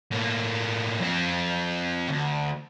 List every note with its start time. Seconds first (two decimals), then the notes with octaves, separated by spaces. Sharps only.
0.12 A2 A#3
1.00 F2 C4
2.09 D2